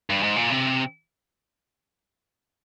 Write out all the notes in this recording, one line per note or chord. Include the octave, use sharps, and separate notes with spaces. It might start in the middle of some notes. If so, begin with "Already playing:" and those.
G2
G#2
A#2
C3